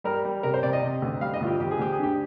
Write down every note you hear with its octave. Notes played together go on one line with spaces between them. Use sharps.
G3 A#4
G3
C3 A#4
C5
C3 D5
D#5
C3
D2
G3 F5
D#5
D2 F4
G4
D2 G4
G#4
D2 G4
G#4
D3 G4